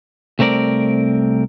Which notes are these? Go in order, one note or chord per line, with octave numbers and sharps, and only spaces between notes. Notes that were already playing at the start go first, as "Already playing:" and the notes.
C2 A3 C4 A#4 D5